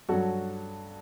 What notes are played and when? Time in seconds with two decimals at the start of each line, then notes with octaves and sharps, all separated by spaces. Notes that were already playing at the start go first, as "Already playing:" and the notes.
0.09 G2 F#3 F#4 A4